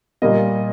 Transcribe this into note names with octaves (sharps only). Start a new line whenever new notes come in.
A#2 G3 A#3 D#5